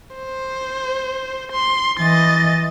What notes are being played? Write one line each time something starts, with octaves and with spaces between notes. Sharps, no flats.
C5
C6
E3 D#5 A6